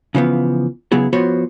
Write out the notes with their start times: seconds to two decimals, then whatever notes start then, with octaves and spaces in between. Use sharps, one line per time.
0.15 C#3 E3 F3 B3
0.92 C#3 F#3 B3 E4 G#4
1.13 F3 B3 F#4 C5 C#5